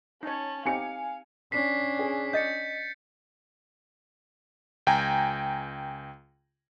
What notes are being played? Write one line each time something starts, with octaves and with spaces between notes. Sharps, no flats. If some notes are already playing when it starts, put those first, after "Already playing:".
C#4 D#4 C#5 A5
C4 D#4 G4 F5 G#5 C#7
C#4 D4 B6 C7
G#4
D#5 G6 A6 C#7
C#2 G5 G#5 A#5